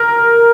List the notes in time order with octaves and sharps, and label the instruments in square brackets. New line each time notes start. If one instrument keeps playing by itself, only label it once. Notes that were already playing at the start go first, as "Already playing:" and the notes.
Already playing: [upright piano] A#4